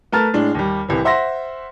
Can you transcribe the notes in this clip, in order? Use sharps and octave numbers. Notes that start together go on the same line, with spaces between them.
A3 A#4 B4 A5 F6 A6
A2 G#3 D4
D#2 G3
C2 C3 E3
C5 E5 F#5 C6 A#6